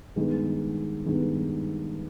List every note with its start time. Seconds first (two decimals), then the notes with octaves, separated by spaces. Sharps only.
0.16 G2 D#3 G#3 B3
1.06 G2 D#3 G#3 B3